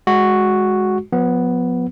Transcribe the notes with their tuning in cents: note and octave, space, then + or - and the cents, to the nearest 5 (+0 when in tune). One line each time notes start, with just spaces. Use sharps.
G#3 +0 F#4 +0
F3 +40 B3 +0